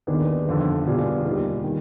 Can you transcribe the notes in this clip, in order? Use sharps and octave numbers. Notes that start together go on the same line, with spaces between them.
D#2 D#3 B3 D4 G#4
G1 F2 D3
B2 G3 D4 F4 G#4
D#2 D#3 G3
C3 D#3